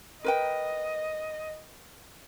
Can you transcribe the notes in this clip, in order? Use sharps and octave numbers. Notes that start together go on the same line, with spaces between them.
A#4 B4 D#5 G5